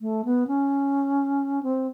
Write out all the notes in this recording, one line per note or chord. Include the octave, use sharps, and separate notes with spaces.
A3
B3
C#4
C4